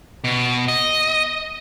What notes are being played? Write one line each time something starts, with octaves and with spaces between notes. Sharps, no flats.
B2
D#5